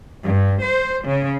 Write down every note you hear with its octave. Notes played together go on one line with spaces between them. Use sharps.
G2
C5
C#3